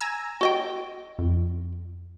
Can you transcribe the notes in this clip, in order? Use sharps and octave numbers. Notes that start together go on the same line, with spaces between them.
G#5 A#5 E6
F#4 D#5 G5
F2